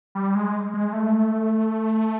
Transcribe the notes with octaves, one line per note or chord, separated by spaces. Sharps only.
G3
G#3
G#3
A3